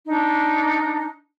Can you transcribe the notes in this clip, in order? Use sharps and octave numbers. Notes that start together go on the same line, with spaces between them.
D4 D#4